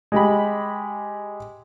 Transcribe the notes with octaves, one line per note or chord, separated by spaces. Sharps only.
G#3 G4 B5